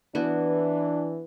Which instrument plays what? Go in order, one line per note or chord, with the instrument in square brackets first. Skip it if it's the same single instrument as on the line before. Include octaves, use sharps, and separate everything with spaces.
[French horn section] E3 [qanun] B3 E4 F#4 [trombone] D4